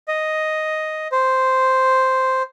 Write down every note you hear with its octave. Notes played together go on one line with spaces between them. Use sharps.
D#5
C5